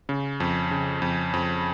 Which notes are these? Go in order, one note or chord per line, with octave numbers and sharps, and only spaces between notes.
C#3
F2
C#3
F2
F2